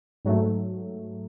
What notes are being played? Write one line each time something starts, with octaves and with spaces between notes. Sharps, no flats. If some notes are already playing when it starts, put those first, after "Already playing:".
G#2 F#3 A3